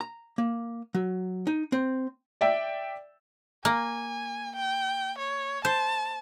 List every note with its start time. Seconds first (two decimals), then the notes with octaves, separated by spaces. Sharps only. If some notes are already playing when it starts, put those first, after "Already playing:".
0.01 A#5
0.38 A#3
0.94 F#3
1.47 D#4
1.72 C4
2.41 D5 E5 G5
3.65 A#3 G#5
4.56 G5
5.18 C#5
5.65 C5 A5